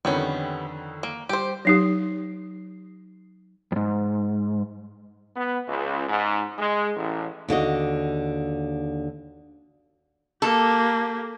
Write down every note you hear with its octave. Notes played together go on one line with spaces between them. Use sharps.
F2 D3 D#3 G3 B3 C#4
A#3
G3 G4 C5
F#3 D#4 G4
F2 G#2
B3
C#2
G#2
G#3
A1
D#2 D3 F#4 D#5
A#3 G4 A4